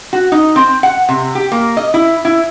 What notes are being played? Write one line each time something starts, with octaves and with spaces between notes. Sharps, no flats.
F#4
D#4
C4
F#5
C3
G4
A#3
D#5
E4
E4